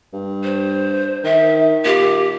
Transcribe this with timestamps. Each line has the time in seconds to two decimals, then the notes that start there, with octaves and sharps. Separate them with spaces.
0.13 G2
0.43 C5
1.24 D#3 E5
1.85 A#2 G4